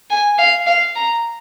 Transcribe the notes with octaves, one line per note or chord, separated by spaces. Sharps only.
G#5
F5
F5
A#5